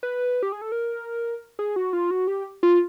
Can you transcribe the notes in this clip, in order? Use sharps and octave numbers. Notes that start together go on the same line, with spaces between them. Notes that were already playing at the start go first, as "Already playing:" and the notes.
B4
G4
G#4
A4
A#4
G#4
F#4
F4
F#4
G4
F4